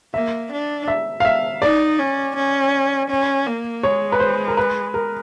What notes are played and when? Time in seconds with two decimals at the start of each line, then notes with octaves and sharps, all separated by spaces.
0.14 A#3 E5
0.52 D4
0.88 E5
1.20 F5
1.25 E5
1.62 D#4 D5
1.98 C#4
2.36 C#4
3.10 C#4
3.46 A#3
3.83 G#3 C#5
4.12 B4
4.20 C5
4.48 A#4
4.57 B4
4.94 A#4